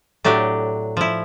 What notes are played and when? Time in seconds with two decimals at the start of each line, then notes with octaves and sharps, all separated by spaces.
0.24 A2 F#3 D4 G4
0.97 F3 E4